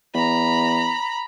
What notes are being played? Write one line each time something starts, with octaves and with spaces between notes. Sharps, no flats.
E2 A#5 B5